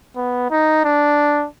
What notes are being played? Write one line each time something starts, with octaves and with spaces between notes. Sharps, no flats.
B3
D#4
D4